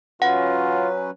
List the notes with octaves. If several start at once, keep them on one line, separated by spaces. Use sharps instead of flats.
F#3 C#4 F4 B4 F#5